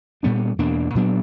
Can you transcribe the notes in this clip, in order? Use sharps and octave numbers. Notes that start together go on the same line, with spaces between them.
A#2 G3 B3 D4
E2 B2 A#3 D4
A#2 F#3 B3 D4